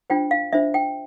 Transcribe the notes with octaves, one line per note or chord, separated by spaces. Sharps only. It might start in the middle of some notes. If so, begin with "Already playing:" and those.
D4 F4 C5 G5
F5
D4 F4 C5 E5
G5